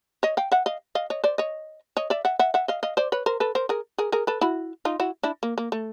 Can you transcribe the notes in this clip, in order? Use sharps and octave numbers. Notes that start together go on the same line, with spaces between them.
C#5 D#5
F5 G5
E5 F#5
D#5 F5
D#5 F5
C#5 D#5
C5 D5
C#5 D#5
C#5 D#5
D5 E5
E5 F#5
E5 F#5
E5 F#5
D#5 F5
D#5 F5
C5 D5
B4 C#5
A#4 C5
A4 B4
A#4 C5
G#4 A#4
G#4 A#4
G#4 A#4
A4 B4
E4 F#4
D#4 F4
E4 F#4
D4 E4
A#3
A#3
A3